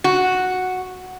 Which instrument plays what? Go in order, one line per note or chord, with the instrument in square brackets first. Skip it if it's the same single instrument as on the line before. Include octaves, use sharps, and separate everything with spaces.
[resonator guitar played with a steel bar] F#4